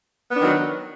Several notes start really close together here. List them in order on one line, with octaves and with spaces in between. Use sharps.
B3 D4 D#3 F#3